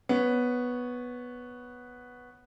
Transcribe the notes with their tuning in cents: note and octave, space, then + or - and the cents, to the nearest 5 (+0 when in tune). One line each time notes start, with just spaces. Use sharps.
B3 +0 C#5 +0